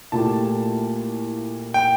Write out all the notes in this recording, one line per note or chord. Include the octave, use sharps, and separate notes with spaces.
A#2 A3 E4 G4 A5
G5